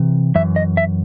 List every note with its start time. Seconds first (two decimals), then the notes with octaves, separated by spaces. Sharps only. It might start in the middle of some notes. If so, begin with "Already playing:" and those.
Already playing: C3 E3
0.35 F#2 E3 E5
0.56 D#5
0.77 E5